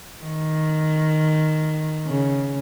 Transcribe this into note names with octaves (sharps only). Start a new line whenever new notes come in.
D#3
C#3